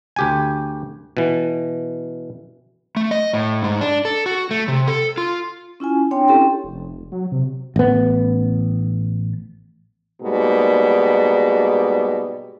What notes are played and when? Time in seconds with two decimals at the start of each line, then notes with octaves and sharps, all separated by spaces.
0.16 D2 G4 G#5
1.17 B2 E3
2.96 A3
3.11 D#5
3.33 A2
3.63 G#2
3.81 D4
4.05 A4
4.26 F#4
4.51 A3
4.68 C3
4.88 A4
5.18 F4
5.80 C#4 E4 F4 G#5
6.11 C4 D4 C#5 G5 C6
6.28 C#4 E4 G4 A4 G5 C6
6.64 F1
7.12 F#3
7.32 C3
7.76 A1 B3
10.22 G#2 B2 G3 A#3 G4